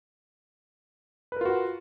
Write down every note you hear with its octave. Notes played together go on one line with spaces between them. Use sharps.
F4 F#4 A#4 B4